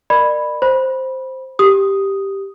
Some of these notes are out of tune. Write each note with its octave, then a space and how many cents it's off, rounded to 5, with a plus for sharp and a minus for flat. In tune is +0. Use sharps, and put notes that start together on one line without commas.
A#4 +0 D5 +35 B5 +0
C5 +0 B5 -15
G4 +0 D#6 +0